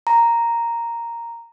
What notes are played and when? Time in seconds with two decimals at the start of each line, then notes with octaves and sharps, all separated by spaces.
0.07 A#5